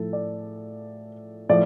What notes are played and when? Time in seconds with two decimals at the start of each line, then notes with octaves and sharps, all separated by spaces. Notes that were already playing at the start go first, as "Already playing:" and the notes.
Already playing: A2 F3 A4
0.13 D5
1.49 A2 F3 D5